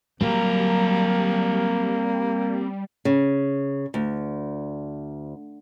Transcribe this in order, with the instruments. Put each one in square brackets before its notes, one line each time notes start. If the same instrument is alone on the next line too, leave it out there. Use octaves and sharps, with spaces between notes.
[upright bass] F#3 [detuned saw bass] G3 [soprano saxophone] A#3 [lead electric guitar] C4 A#4
[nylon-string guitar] C#3
D2